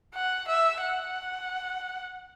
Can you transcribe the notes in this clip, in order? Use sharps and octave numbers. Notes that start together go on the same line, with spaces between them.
F#5
E5
F#5